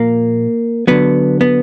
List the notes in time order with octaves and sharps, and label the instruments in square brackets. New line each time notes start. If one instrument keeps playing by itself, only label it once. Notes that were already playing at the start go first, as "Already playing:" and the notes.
Already playing: [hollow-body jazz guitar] A#2 F3 A#3
D3 F#3 B3
B3